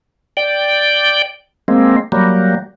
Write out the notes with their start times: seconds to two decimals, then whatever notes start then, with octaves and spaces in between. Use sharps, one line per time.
0.37 D5 G5
1.68 G#3 A#3 C4
2.12 F#3 G3 A#3